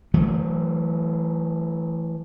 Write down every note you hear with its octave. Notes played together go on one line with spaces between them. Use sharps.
E3 F#3 A3